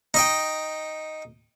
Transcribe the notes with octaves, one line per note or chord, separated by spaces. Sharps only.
D#4 D#5 G5